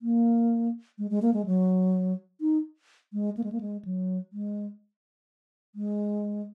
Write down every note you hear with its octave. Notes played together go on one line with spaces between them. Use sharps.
A#3
G#3
G#3
A#3
G#3
F#3
D#4
G#3
A#3
G#3
A#3
G#3
F#3
G#3
G#3